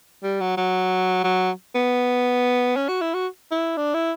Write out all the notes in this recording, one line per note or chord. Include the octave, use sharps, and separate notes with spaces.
G3
F#3
F#3
F#3
B3
C#4
F#4
E4
F#4
E4
D4
E4